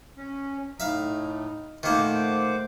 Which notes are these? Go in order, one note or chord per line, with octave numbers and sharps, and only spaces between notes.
C#4
A2 D#4 E5 F5
A#2 D#3 A3 A#3 C5 F#5 D6